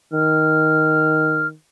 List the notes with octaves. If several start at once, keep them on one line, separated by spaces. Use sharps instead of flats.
D#3 F6